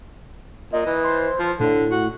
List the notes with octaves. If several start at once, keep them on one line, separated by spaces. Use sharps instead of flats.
A#2 D#5
E3
C5
F3
A2 D3
F#4